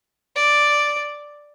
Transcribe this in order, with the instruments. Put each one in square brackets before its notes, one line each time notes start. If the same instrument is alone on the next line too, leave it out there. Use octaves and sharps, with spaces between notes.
[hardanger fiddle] D5